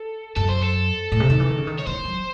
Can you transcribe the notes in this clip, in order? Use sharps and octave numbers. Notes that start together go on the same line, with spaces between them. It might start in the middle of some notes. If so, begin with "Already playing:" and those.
Already playing: A4
F#2 A4
C5
A4
A2
C3
D#3
E3
D#3
C#3
D#3
C#5
E3 C5
F#3